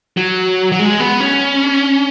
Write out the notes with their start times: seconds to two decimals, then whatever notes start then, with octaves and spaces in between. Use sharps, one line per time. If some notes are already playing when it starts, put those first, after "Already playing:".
0.17 F#3
0.72 F#3
0.79 G#3
1.00 B3
1.20 C#4